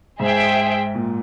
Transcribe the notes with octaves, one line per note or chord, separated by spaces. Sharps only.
G#2 G#4 C5 E5 G5
A#2